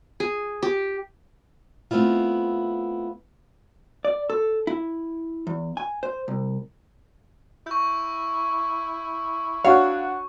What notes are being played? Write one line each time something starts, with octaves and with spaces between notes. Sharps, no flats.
G#4
G4
A3 B3 C4 E4 F4
D5
A4
E4
E2
G#5
C5
C2
E4 C#6 G6
D4 F#4 C#5 F5